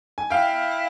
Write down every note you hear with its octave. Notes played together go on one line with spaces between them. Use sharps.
G#5
E4 F5 G5